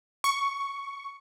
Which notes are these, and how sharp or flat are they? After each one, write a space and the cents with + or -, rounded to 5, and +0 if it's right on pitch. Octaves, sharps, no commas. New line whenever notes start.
C#6 +5